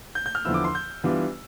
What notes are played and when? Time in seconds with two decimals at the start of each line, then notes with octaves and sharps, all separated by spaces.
0.15 G6
0.26 G6
0.35 F6
0.45 E2 D3 F3 B3 E4 E6
0.54 D6
0.64 C6
0.75 G6
1.04 E3 G3 B3 D4 F4